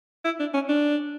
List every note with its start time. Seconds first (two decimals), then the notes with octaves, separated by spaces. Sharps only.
0.25 E4
0.40 D4
0.54 C#4
0.69 D4